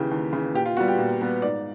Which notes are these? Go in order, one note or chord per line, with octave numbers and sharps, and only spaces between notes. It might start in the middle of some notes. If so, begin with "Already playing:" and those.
Already playing: D#2 C#3 E3 G4
D#2
C#3 E3
A#2 G4
F4
G3 B3 F#4
G4
A#2
G3 B3
G#2 D5